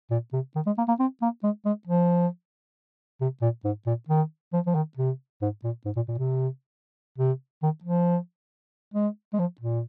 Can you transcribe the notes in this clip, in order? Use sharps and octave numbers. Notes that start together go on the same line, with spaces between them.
A#2
C3
D#3
G#3
A#3
A#3
C4
A#3
G#3
G#3
F3
C3
A#2
G#2
A#2
D#3
F3
F3
D#3
C3
G#2
A#2
G#2
A#2
A#2
C3
C3
D#3
F3
G#3
G#3
F3
A#2